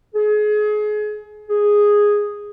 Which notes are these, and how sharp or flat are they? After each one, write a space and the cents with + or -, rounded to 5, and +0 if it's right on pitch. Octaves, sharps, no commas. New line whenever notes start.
G#4 +30
G#4 -5